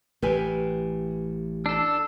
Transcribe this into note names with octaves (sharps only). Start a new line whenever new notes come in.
A1 A2 G4 B4 G#5
D4 A4 E6